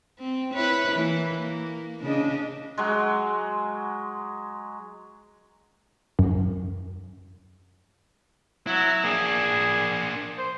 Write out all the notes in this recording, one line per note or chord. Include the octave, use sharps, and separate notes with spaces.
C4
E4 B4 C#5
E3 A#3
A#3
C#3 D4 D#5
F#3 G#3
F#2
F#3 E4
A#3 D4 G#4
C5